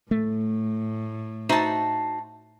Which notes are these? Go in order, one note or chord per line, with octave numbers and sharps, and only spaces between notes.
A2 A3
D#4 F#4 C5 E5 A5